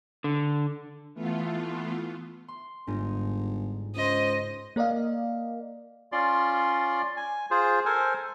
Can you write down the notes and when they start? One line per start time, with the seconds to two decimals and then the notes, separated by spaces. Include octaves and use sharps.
0.24 D3
1.14 E3 A3 B3 F4
2.48 C6
2.87 G1 G#2 G#3 D#4
3.96 C#2 C5 D#5
4.76 A#3 A#4 D5 D#5 F5
6.12 C#4 F4 D5 C6
7.17 G#5
7.51 F4 G#4 C5
7.86 A4 A#4 C5 G#5